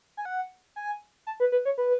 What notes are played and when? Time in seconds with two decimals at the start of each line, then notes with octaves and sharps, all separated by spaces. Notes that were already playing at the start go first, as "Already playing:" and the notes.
0.17 G#5
0.25 F#5
0.76 G#5
1.27 A5
1.40 B4
1.52 B4
1.65 C#5
1.78 B4